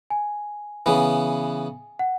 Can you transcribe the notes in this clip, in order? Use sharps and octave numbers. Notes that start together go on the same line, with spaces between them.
G#5
C#3 E3 B3 G#5
F#5